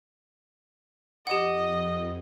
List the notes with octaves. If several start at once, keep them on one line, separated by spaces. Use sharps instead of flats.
F2 G4 D#5 F#5